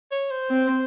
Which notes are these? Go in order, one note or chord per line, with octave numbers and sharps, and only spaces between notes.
C#5
C5
C4